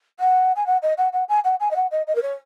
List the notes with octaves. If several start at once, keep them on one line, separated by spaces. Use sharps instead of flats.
F#5
G#5
F#5
D#5
F#5
F#5
G#5
F#5
G#5
D#5
F#5
D#5
D#5
A#4
C#5